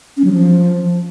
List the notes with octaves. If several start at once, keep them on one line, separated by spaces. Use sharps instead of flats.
C#4
F#3
F3